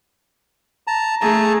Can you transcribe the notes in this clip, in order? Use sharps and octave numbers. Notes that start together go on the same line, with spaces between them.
A5 A#5
A3 G#4 A5 A#5